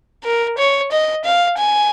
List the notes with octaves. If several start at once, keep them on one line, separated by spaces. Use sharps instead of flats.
A#4
C#5
D#5
F5
G#5